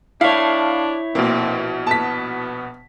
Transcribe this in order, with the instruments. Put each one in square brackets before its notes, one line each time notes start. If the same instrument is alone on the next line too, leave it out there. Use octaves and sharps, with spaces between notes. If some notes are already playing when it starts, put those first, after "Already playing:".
[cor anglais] D4 [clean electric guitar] E4 C#5 [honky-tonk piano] F5
[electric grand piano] A#1 B2 [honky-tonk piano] A#3 [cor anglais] C4
[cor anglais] B3 [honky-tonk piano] A5 B6